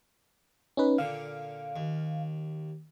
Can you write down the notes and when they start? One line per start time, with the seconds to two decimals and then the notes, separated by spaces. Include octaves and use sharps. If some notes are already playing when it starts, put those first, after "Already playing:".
0.77 C#4 D#4 B4
0.98 A#2 D3 F5
1.76 D#2